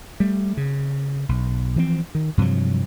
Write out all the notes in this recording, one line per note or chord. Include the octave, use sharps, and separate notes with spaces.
G3 A3
C#3
B1
E3 F3 B3 C4
D#3
G2 C3 F3 F#3